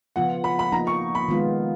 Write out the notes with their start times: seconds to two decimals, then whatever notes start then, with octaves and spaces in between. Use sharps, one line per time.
0.16 C#3 F3 B3 F4 F#5
0.44 B5
0.59 B5
0.72 F3 A#3 D#4 A#5
0.87 C#6
1.15 B5
1.28 D#3 G#3 B3 F4